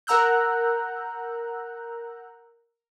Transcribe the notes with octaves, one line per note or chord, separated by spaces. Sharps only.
A#4 F#5 A#5 E6 F#6 G6